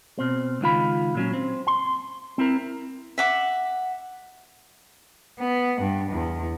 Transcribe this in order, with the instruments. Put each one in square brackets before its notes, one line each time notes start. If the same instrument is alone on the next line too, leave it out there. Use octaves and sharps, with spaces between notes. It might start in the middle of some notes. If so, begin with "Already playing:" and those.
[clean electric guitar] B2 C4
C#2 D#3 F4 B5
A#2 F#3 C#4
C4
C6
C4 E4 A#4
[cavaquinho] E5 F#5 D6
[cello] B3
G2
E2